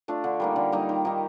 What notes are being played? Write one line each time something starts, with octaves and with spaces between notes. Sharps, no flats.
A3 D4 F4
D3
G3 A#3 D#4
D3
G3 A#3 D#4
D#3
A#3 D#4 G4